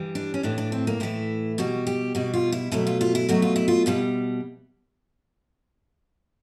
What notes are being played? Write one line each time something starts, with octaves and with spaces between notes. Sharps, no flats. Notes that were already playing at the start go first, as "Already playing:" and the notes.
Already playing: G2 E3 G3
D4
C#4
A2 E3 A3 D4
D4
C4
A#3
A2 E3 A3 E4
B2 G3 F#4
G4
B2 G3 F#4
F4
E4
B2 F#3 A3 E4
F4
F4
E4
B2 F#3 A3 F#4
F4
E4
F4
B2 G3 F4